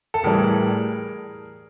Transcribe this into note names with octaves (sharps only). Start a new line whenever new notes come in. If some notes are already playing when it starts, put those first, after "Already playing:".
A4
A2 E3 G3 G#4 A#4